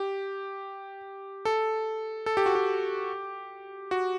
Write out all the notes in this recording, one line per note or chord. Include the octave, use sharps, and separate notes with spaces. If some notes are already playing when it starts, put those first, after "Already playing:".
Already playing: G4
A4
A4
G4
F#4
G4
F#4